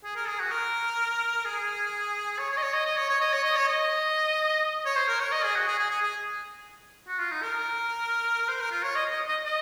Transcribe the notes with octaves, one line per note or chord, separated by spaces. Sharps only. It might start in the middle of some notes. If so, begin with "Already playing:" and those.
G#4
A#4
G#4
F#4
A#4
G#4
C#5
C#5
D#5
C#5
D#5
D#5
C#5
C#5
D#5
C#5
D#5
C#5
D#5
C#5
C5
A#4
C#5
D#5
G#4
F#4
G#4
G#4
G#4
G#4
F#4
F4
D#4
A#4
C5
A#4
F4
C#5
D#5
D#5
D#5
D#5